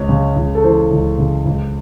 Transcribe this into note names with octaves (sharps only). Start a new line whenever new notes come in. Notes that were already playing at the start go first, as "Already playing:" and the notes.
Already playing: C#2 C#5
C#3
C#2
A4
E3 C5
C#2
C#3
C#2